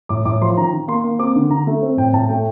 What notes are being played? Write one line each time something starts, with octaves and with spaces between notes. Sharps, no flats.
A2 D6
A2 D6
F3 C6
D#3 A#5
D#3
A#3 C6
A#3
C4 D6
D3
D3 A#5
A3
C4
A2 G5
A2 A5
A3 G5